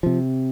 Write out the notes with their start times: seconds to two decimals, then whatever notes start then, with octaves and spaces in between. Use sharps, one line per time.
0.03 C3 F3